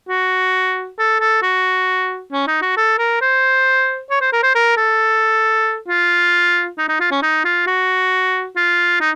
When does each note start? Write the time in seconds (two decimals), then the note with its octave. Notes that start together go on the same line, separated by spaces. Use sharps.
0.09 F#4
0.99 A4
1.21 A4
1.43 F#4
2.32 C#4
2.47 D#4
2.62 F#4
2.77 A4
2.99 A#4
3.22 C5
4.11 C#5
4.21 C5
4.32 A#4
4.43 C5
4.55 A#4
4.77 A4
5.88 F4
6.78 D#4
6.89 D#4
7.00 F4
7.11 C#4
7.22 D#4
7.45 F4
7.67 F#4
8.56 F4
9.01 D#4